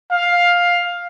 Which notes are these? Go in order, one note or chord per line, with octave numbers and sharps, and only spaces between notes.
F5